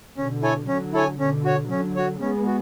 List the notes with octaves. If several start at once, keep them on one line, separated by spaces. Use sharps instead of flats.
B2 D3 C#4
E4 A4 C#5 G#5
D3 F#3 C#4
E4 A4 C#5 G#5
B2 D3 C#4
F#4 C#5
D3 F#3 C#4
F#4 C#5
G#3 B3 C#4
F#4